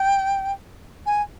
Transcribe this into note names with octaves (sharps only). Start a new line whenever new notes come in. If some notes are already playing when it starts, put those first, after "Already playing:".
Already playing: G5
G#5